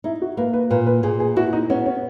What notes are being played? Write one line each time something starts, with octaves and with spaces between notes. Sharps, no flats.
D#4 E4
F#4
A#3 B4
B4
A#2 B4
B4
A#2 G#4
G#4
E4 F#4
D#4
B3 C#4
C#4